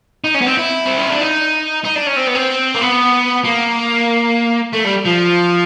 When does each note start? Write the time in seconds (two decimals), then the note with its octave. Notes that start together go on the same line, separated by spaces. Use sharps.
0.24 D#4
0.35 C#4
0.41 B3
0.46 C4
0.57 E4
0.86 C4
0.98 C#4
1.10 D4
1.21 D#4
1.84 D#4
1.95 D4
2.06 C#4
2.16 C4
2.27 B3
2.35 C4
2.75 A#3
2.81 B3
3.45 A#3
4.73 A3
4.84 G3
5.05 F3